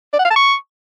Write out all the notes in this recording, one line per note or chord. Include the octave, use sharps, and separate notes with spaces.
D5
F#5
F5
A5
C#6